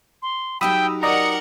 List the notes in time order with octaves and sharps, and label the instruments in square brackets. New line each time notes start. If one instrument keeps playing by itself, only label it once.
[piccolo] C6
[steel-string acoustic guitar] F#3 D#4 G4 [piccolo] G5 [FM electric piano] B5 D#6 E6
[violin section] A#4 F#5 C#7 [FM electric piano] D5 D#5 A#5 [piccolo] D#6